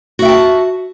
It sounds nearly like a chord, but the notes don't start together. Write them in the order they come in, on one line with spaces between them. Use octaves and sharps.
F#4 E5 G5 A5